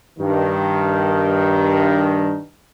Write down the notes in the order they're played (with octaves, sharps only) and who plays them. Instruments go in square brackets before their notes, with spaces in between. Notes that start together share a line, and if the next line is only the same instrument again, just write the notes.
[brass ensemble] G2 D#3